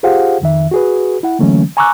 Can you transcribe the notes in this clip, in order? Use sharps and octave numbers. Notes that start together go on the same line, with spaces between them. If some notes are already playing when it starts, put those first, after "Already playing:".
F4 G4 G#4 C5 F5 F#5
F2 D#3 E5
F#4 G#4 B4
E4 F#5
D3 E3 F#3 A3 A#3 C#4
G#5 A#5 C#6 D6 E6 F#6